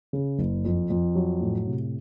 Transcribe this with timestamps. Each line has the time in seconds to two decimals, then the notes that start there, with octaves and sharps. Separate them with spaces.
0.13 C#3
0.39 F#1
0.65 F2
0.90 F2
1.15 F#3
1.41 A2
1.67 C3